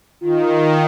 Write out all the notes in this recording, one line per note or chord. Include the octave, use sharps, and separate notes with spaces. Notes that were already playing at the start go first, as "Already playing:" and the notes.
D#3 F4